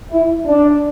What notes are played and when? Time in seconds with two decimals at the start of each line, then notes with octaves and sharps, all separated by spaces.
0.11 E4
0.47 D4